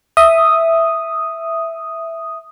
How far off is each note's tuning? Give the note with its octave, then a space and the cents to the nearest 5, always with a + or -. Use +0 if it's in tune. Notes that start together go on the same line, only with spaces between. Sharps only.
E5 +0 D#6 +0